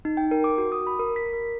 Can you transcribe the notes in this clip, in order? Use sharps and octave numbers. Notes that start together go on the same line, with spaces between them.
D#4
G5
A#4
D6
F#4
D#6
B5
A#4
B6
A#4